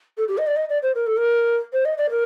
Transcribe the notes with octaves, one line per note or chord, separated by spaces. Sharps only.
A4
G4
D#5
D5
D#5
D5
C5
A#4
A4
A#4
C5
D#5
D5
A#4